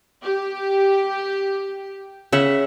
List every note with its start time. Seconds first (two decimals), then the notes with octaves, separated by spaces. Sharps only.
0.24 G4
2.32 C#3 E5 F#5